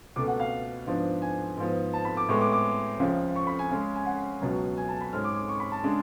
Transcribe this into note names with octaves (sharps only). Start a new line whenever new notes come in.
C#2 B2 A3 D6
F#5
F5
G#2 F3 B3 D4
G#5
G#2 F3 B3
A5
B5
D6
A2 G#3 B3 C#6
D6
D6
C#2 C#3 F3
C#6
B5
G#5
C#3 G#3 C#4
G#5
F#5
C#2 B2 F#3
G#5
A5
B5
G#2 G#3 C#4 F6
D6
D6
C#6
B5
A5
C#3 G#3 D4